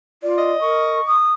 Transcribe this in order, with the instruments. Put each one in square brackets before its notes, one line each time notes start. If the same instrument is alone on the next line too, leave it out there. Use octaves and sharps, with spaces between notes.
[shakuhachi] F4 [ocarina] D5
[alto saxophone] D#5
[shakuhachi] A#4 [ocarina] C#6
[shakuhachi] D#6